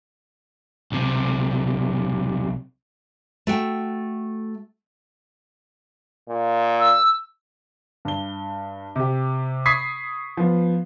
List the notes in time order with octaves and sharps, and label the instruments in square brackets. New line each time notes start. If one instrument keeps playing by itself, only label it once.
[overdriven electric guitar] B1 C3
[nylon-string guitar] A3 F#4 G5
[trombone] A#2
[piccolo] E6
[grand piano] G2 G7
C3 G4
B5 C#6 D#6 G#6 B6 C7
F3 B3